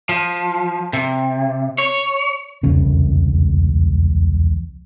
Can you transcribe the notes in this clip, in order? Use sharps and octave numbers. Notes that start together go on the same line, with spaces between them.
F3
C3
C#5
E1 C2 F2 C#3